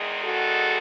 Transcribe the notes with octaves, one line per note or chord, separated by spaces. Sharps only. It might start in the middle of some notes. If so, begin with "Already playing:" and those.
Already playing: E2 D#3 G#3
F#4 A4